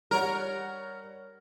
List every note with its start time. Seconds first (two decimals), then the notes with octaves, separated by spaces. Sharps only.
0.11 G3 A#4 C#5 F#5